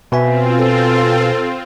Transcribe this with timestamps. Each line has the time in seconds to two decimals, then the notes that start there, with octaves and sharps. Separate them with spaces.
0.12 B2 C4 F4 B4 E5 G#5
0.58 A4